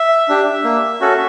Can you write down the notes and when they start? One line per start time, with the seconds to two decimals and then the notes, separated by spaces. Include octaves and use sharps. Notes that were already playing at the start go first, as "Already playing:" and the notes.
Already playing: E5
0.29 D4 G4
0.64 A#3
1.01 C#4 F#4 A4